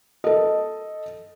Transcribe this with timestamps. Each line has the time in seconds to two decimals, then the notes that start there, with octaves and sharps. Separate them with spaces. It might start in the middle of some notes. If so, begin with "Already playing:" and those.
0.24 A4 D#5